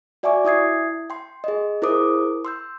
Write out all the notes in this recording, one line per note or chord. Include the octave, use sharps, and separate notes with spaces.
F#4 D5 E5 G#5 C#6 D6
E4 E5 D#6 G#6 C7
G5 C6
G#4 D#5
E4 G#4 A#4 C5 D6 D#6
C6 E6 G6